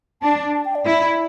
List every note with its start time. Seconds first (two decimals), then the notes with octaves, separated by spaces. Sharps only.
0.22 D4 A5
0.54 A5
0.65 G5
0.75 D5
0.86 E4